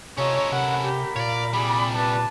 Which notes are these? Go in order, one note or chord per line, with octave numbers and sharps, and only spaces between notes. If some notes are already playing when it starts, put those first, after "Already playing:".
C3 C#4 F4 A4 C#5 D#5 A#5
C3 A#4 F#5 B5
G4
A#2 C#5 D5 F5
C3 G3 G#4 D5 B5
B4 D5 A5